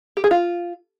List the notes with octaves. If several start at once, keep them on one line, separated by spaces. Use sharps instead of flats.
G4
G#4
F4